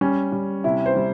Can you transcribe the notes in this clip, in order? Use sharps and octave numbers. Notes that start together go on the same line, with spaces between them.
G3 C#4
G3
C3 E4
C5
G3